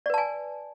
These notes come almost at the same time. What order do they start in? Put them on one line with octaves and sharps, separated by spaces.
D5 B4 A5 G#5